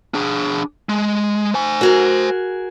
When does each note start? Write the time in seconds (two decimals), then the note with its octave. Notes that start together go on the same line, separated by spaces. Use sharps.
0.14 D4 G#4
0.89 G#3
1.54 C5 G#5
1.81 F#4 G#4 A#4